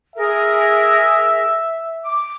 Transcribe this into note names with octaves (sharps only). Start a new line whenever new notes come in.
G#4 A#4 E5
D6